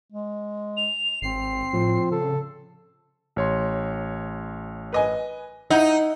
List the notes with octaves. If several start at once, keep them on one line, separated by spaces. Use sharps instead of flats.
G#3
F7
G#1 C4 C7
A2 F3
C#3 A4
A1 C#5 C6
B4 D#5 G#5
D#4 E4 F#5